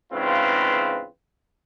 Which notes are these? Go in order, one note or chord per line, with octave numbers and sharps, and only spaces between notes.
E2 G#2 C#3 C4 F4 B4